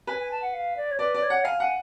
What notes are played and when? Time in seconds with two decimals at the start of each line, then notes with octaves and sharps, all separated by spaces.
0.07 B4 G#5
0.19 G#5
0.31 A5
0.42 F#5
0.54 F5
0.77 D5
0.91 C#5
0.99 B4 D5
1.15 D5
1.23 C#5
1.30 F#5
1.45 F5 G#5
1.60 F#5 G#5